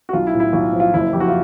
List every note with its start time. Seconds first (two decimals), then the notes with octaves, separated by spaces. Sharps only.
0.09 F#4
0.13 B1 F4
0.27 E4
0.34 A2
0.40 E4
0.53 B1 F4
0.73 F3
0.80 F4
0.94 F#1 E4
1.13 F2 G4
1.20 F#4
1.28 F4